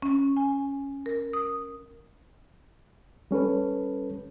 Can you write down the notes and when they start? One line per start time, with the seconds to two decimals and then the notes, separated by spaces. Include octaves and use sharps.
0.02 C#4
0.37 G#5
1.06 A#4
1.33 D#6
3.31 G3 C#4 A4 B4